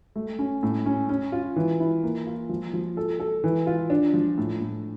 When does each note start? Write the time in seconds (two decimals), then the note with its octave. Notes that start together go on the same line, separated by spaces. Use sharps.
0.16 A3
0.39 C#4
0.63 A2
0.86 C#4
1.09 C#4
1.32 F4
1.56 E3
1.80 E4
2.04 A#3
2.26 F4
2.49 F3
2.73 F3
2.97 A4
3.20 A4
3.44 E3
3.67 F4
3.90 D4
4.13 F3
4.38 A2
4.61 A2